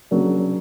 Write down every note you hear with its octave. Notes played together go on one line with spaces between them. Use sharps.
C#3 F#3 A#3 D4